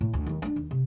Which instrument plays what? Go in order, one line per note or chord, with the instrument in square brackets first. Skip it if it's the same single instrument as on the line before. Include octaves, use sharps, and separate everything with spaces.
[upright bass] A2
D2
D#2 F3
B3 D4
D#2
C3